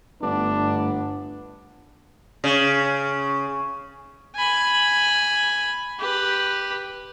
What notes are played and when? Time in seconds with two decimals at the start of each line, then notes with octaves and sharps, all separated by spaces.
0.22 G1 G2 A3 B3 D4
2.44 C#3
4.36 G#5 B5
5.99 G4 B4